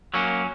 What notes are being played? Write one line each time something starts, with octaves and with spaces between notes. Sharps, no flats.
F#3 A#3 C#4